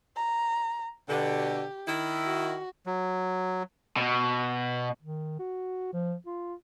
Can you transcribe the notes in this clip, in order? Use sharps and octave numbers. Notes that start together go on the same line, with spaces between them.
A#5
B2 D3 G4
D#3 E4
F#4
F#3
B2
D#3
F#4
F3
F4